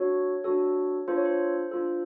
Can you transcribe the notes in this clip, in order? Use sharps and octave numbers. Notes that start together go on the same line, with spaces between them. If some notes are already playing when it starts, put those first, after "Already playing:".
Already playing: D4 F#4 A4 C#5
D4 F#4 A4
D4 F4 A4 C5
C#5
C5
D4 F4 A4